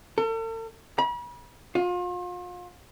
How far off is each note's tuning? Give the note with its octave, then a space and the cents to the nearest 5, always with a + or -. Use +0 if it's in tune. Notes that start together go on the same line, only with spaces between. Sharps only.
A4 +45
B5 -40
F4 +35